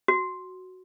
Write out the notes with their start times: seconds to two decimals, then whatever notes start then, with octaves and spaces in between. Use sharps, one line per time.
0.08 F#4